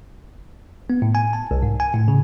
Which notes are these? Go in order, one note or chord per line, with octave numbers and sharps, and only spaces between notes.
B3
A2
G#5
A5
C2
G#2
G#5
A2
C#3